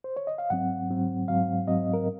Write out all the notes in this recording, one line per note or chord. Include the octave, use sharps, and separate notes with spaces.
C5
C#5
D#5
F5
G#2 F#3 C4 F#5
G#2 F#3 C4
G#2 F#3 C4 F5
G#2 F#3 C4 D#5
A#4